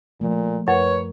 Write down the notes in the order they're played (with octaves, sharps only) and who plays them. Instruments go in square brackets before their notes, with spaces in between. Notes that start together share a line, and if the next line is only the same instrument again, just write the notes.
[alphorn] A#2 [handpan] F3 A3
[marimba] F#2 [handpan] A#4 [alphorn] B4 [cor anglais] C#5